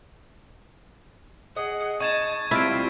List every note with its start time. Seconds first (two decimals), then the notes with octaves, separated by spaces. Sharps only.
1.57 G#4 D#5 F#5
2.00 D#4 A5 C#6 G#6 E7
2.51 G3 C4 E4 F4 A5 B6 D7